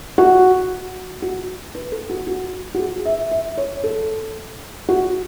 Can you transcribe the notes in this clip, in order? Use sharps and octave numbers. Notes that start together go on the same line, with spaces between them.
F#4
F#4
B4
A4
F#4
F#4
F#4
G#4
E5
E5
C#5
A4
F#4